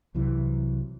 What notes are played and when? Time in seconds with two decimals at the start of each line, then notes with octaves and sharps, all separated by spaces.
0.14 C2 C3 E3 F#3